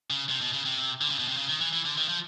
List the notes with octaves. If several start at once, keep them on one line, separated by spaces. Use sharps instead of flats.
C#3
C3
B2
C#3
C3
D3
C#3
B2
C3
C#3
D#3
E3
E3
D3
D#3
F3